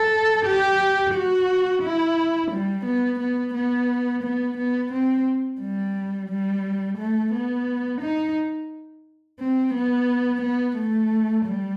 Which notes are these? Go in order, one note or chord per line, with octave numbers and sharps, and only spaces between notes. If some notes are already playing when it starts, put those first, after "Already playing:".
Already playing: A4
G4
F#4
E4
G3
B3
B3
B3
B3
B3
C4
G3
G3
A3
B3
D#4
C4
B3
B3
A3
G3